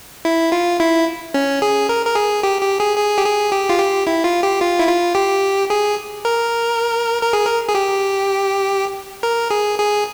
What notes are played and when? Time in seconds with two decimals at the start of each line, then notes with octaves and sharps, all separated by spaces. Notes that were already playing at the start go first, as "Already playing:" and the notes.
0.25 E4
0.52 F4
0.80 E4
1.34 C#4
1.62 G#4
1.89 A#4
2.06 A#4
2.15 G#4
2.43 G4
2.61 G4
2.80 G#4
2.97 G#4
3.18 G4
3.25 G#4
3.52 G4
3.69 F4
3.79 G4
4.07 E4
4.24 F4
4.43 G4
4.61 F4
4.79 E4
4.88 F4
5.15 G4
5.70 G#4
6.25 A#4
7.22 A#4
7.33 G#4
7.47 A#4
7.68 G#4
7.75 G4
9.23 A#4
9.50 G#4
9.79 G#4